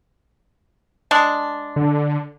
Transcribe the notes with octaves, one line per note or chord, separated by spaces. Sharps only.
G#3 D4
D3